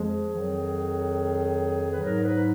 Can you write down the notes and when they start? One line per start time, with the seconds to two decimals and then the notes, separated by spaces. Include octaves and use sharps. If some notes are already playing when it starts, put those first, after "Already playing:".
Already playing: F2 F3 G#3 G#4
0.33 F2 D#3 F#3
1.89 B4
2.00 G#2 F#3 A#4
2.21 B4